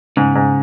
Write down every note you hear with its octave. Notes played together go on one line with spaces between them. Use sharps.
G#2 C#3
G#2